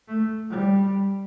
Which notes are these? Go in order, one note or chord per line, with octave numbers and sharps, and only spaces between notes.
A3
G3